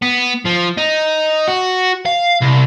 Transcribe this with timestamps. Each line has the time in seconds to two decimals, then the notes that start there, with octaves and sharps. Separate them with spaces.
0.02 B3
0.46 F3
0.78 D#4
1.48 F#4
2.06 F5
2.41 C2